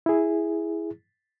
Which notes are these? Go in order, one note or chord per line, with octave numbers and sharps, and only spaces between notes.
E4 G#4